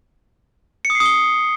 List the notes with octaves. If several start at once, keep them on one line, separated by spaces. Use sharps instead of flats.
C#7
D#6
C7
D#6
G7